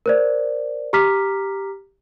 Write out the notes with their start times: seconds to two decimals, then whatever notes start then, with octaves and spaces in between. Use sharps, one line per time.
0.06 A#4 C5 D5
0.93 G4 A#5 D6 F6 B6